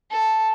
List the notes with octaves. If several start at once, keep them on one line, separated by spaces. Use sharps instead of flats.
A4